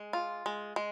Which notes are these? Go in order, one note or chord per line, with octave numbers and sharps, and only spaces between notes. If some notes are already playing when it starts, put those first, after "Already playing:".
Already playing: G#3
F4
G#3
G#3